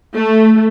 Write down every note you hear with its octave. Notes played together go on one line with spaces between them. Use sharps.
A3